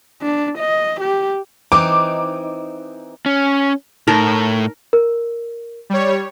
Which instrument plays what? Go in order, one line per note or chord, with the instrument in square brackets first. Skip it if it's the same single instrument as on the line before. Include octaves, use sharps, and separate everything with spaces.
[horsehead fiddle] D4
D#5
G4
[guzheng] E3 C4 D#4 [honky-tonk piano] D6
[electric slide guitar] C#4
[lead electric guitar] A2 [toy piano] D#4 [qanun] A#4
[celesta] A#4
[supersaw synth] G3 C#5